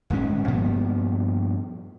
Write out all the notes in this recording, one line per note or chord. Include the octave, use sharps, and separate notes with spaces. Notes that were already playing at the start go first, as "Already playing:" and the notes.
D1 G1 G#3 C#4
G2 A#2 F3 B3